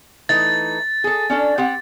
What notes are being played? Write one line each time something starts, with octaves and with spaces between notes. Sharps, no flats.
E3 A3 D#4 A6
G#4 A4
C#4 D4 A4
C4 G4 F#5